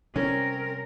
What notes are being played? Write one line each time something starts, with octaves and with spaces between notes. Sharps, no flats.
C3 G3 C4 C#4 A#4